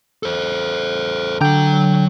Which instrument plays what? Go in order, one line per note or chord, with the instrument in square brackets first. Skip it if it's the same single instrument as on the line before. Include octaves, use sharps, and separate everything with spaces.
[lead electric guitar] A4 C5
[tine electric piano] D3 G5 [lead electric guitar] F#3 A#5